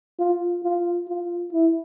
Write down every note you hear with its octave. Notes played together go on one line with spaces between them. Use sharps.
F4
F4
F4
E4